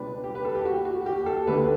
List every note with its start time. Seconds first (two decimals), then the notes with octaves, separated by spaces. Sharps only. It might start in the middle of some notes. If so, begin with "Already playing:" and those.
Already playing: C#2 B2 G3 D4 B4
0.24 G4
0.35 B4
0.45 A4
0.55 G4
0.65 F#4
0.85 F#4
1.06 G4
1.26 A4
1.47 D2 D3 A3 D4 B4